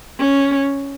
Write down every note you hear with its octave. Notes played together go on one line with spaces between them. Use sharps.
C#4